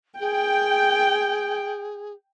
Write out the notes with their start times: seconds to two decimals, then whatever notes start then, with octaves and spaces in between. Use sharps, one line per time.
0.20 G#4 G5